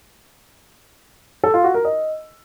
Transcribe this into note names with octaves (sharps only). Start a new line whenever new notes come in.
A4
F4
F#4
A#4
D#5